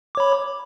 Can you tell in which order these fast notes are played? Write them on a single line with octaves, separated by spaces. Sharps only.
D6 C#5 B5